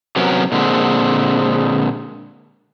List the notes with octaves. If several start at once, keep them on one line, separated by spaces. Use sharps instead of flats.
C3 F#3 B3 C#4 A#4
A#2 D3 G#3 C4